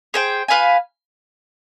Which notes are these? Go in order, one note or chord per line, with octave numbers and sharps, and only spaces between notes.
G#4 C5 G5
F4 B4 F5 G#5